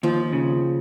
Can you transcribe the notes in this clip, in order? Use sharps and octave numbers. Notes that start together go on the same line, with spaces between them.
D#2 F3
C#3